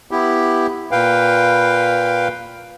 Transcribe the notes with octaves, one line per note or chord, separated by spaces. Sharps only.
B3 E4 G4
A#2 B4 F5 G5